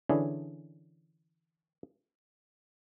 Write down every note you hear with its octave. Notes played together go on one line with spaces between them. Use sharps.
D3 E3 C#4 D4 E4 G#4